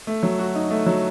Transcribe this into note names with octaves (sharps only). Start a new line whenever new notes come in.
A3
F#3
F#4
D#4
A3
F#3